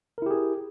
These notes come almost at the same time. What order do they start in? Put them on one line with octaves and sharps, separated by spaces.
A#4 E4 G4 G#4